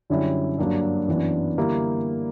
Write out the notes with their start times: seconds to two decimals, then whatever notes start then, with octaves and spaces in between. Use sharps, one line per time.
0.10 F#2 D3 G3 C#4 E4
0.58 G2 F#3 A#3 D4
1.07 F#2 E3 B3 D4
1.57 D3 G3 A#3 E4 G4